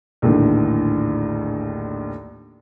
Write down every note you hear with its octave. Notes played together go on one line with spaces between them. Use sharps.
A#1 D#2 A2 D3